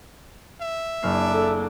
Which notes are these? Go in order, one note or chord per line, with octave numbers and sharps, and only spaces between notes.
E5
F#1 A#3 D4 F6 C7
A4